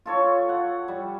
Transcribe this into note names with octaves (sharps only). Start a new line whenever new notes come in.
F4 A4 C#5
F#5
G3